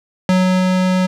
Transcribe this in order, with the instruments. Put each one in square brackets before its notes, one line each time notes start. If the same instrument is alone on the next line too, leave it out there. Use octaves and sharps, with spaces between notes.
[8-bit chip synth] F#3